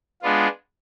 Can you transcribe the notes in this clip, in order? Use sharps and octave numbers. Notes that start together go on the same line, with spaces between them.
G#3 B3 D4 F4